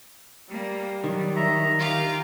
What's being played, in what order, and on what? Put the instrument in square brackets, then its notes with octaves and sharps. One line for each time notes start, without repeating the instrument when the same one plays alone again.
[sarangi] G3 [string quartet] A#3
[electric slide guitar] D#3 [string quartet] F#3
[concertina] D#5 E5 A#5
[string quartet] F4 G4 F5 [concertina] A#5